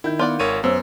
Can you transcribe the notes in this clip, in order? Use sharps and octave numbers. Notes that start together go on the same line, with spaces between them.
D#3 E4 G6
B3 F4 D5 F#5
G#1 A#4 C#5 D#7
F#2 B3 C5 C#5 E6